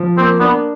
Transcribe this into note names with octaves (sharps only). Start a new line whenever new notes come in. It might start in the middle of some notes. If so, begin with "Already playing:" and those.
Already playing: F3
A#3 C4
B3 D4